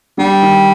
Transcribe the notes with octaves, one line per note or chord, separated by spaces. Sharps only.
D3 G3
D#3